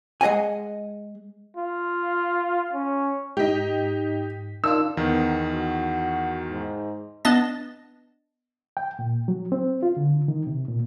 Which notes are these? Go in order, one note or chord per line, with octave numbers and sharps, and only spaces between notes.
G#3 G#4 D#5 F#5 G#5
F4
C#4
G#2 D#4 G4 B6
D#3 D4 F4 E6
E2 D#3 B3
F#4
G#2
B3 D4 D#5 A5 A6
G5
A#2
F#3
C4
F4
D3
D#3
C3
A#2